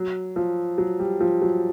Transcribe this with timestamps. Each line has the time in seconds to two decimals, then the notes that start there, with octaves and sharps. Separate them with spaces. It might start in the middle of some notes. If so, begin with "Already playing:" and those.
Already playing: F#3
0.36 F3
0.78 F#3
0.99 G3
1.20 F3
1.42 F#3